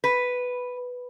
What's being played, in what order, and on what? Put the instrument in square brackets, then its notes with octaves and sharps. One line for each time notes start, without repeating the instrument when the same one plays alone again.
[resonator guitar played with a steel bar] B4